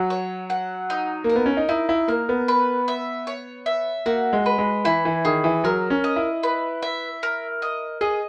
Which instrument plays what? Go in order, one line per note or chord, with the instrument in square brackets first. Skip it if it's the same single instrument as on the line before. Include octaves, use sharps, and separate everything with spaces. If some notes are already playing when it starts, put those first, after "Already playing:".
Already playing: [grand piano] F#3 [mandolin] F#5
[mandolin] C#5
F#5
D#4
[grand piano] A#3
[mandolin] A#4
[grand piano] B3
C#4
D#4
[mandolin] D#4 [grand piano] E4
[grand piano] E4
[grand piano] A#3 [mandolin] A#4
[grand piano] B3
[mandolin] B4
E5
C#5
E5
[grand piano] A#3 [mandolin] F#4
[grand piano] G#3
[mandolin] B4
[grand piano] G#3
[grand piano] E3 [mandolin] E4
[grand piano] E3
[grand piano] D#3 [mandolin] G#4
[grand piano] E3
[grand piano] F#3 [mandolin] A#4
[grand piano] C#4
[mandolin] D#5
[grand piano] E4
[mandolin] B4
E5
A#4
D#5
[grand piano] G#4 [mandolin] D#5